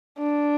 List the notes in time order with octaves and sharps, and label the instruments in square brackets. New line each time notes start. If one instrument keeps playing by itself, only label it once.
[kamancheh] D4